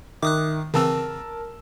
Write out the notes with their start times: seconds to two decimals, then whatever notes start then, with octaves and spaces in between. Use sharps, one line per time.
0.22 D#3 E5 D6 D#6 F#6
0.74 C#3 E3 C4 A#4 A5 E6